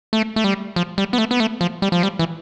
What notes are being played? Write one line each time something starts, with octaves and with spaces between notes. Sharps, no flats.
A3
A3
G3
F3
G3
B3
A3
B3
A3
F3
G3
F3
G3
E3